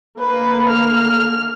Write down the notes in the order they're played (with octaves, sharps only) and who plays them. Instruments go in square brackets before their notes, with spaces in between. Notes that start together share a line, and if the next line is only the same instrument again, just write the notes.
[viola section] D3 A#3 [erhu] B4
[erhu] F6